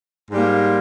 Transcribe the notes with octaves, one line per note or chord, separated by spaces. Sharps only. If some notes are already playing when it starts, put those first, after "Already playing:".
G#2 G3 A#3